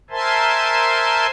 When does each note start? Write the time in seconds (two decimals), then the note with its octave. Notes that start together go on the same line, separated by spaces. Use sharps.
0.10 A#4 C5 E5 G#5 A5 C6